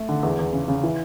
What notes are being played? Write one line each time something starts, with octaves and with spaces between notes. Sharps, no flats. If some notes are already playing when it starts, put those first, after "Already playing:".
Already playing: A3
D3
E2
E2
C#3
C#3
E3